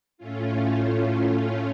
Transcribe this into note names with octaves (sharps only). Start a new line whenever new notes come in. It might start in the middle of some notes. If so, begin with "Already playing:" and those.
A2 A3 C#4 F4